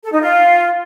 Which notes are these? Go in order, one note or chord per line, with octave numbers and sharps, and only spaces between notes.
A4
D#4
F4